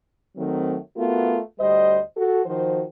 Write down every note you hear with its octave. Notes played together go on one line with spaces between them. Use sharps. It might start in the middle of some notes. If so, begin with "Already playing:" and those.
D#3 F#3 A3 C4
A3 B3 F4 F#4 A#4
D2 G3 C5 D#5
F#4 A4
D#3 F3 F#4 C5